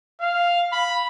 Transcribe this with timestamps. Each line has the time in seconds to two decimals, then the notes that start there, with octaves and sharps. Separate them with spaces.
0.21 F5
0.72 B5